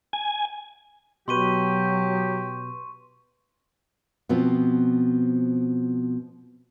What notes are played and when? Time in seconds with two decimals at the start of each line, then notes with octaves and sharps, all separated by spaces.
0.13 G#5
1.28 B2 F#3 G4 B4 C6 C#6 D#7
4.29 B2 F3 B3 C4